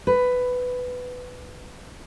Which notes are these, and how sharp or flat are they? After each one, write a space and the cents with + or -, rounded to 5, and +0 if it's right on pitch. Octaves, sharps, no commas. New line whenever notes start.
B4 +10